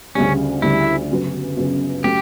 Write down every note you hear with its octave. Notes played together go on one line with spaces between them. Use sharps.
D2 C#3 G3 C#4
D2 C#3 G3 E4
F#2 C#3 F#3 B3
F#2 C#3 F#3 B3
F#3 A3 C#4 F#4 G4